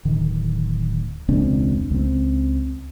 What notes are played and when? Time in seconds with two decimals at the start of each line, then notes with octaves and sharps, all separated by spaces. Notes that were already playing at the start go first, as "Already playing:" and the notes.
0.05 D1 D#3
1.28 E1 C#2 C4 D4
1.91 C#2 C4